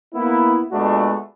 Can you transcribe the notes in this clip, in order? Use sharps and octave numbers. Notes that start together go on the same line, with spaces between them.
A#3 B3 E4
A#2 G#3 A3 B3 D4 F#4